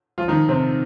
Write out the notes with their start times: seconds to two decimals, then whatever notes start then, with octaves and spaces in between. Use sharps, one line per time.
0.18 F3 F4
0.28 D#3 D#4
0.49 C3 C4